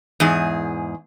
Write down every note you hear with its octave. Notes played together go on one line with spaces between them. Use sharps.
E2 G#2 G#4